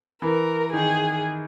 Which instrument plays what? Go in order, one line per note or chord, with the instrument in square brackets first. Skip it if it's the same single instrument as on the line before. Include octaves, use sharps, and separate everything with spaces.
[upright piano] E3 [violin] A#4
[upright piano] D#3 [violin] G#4